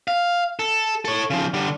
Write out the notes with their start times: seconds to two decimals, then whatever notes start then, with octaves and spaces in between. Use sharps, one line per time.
0.08 F5
0.59 A4
1.05 A4 C#5
1.30 C#3 F3
1.54 D3 G3